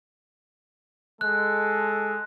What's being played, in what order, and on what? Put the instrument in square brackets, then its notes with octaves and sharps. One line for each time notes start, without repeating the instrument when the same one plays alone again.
[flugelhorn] G#3 [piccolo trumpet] A4 [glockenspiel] F#6